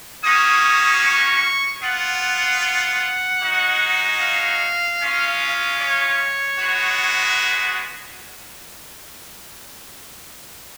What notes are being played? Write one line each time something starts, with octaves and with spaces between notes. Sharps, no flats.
A#3 C#4 F#4 D#6
C#6
B3 F4 F#5
F#5
G#3 D#4 F#4
F5
G#3 C#4 F4
C#5
G#3 B3 F#4